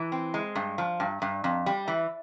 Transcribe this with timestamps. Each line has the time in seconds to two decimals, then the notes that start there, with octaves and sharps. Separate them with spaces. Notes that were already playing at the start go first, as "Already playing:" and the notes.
Already playing: E3
0.12 C4
0.34 G#3
0.55 G2
0.78 F3
1.00 G2
1.22 G2
1.44 F2
1.66 G3
1.88 E3